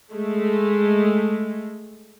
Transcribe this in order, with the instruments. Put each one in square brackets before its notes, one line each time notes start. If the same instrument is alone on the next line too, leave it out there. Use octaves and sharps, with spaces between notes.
[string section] G#3 A3